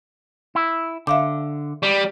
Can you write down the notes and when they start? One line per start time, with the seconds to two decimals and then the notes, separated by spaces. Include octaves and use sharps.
0.55 E4
1.07 D3 E5 F5 D6
1.83 G3